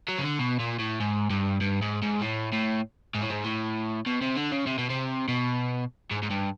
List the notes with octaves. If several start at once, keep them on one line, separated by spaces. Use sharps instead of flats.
F#3
C#3
D3
B2
A#2
A2
G#2
G2
G2
G#2
G#2
A2
A2
G#2
A2
G#2
A2
B2
C3
D3
C#3
C3
B2
C3
B2
G#2
G#2
G2